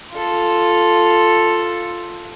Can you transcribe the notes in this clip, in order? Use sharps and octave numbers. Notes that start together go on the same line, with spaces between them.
F4 A4